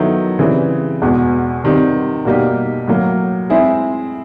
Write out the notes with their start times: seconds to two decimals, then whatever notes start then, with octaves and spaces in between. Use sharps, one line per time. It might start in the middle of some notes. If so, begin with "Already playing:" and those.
Already playing: D#3 F#3 B3 E4 A4
0.39 C#3 E3 G3 C4
1.02 E2 B2 G#3
1.64 C3 D#3 G3 C4
2.25 B2 G3 A#3 D#4 G4
2.88 A2 F#3 A#3
3.50 G#3 C4 E4 G#4